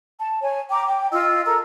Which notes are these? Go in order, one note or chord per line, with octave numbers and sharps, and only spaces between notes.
A5
C#5 G#5
G5 A#5 D6
G5
F4 D#5 E6
A4 A#4 A#5 E6